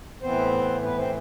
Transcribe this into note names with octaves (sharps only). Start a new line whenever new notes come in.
A2 E3 B3 C4 C5
B3 B4
C4 C5